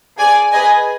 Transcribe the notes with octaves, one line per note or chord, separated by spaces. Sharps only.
G#4 D5 G#5
G#4 B4 D#5 G#5